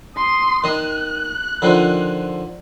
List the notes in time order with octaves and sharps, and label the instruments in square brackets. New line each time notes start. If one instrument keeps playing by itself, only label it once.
[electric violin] C6 D#6
[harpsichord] D#3 D#5 [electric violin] F#6
[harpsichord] D3 D#3 F3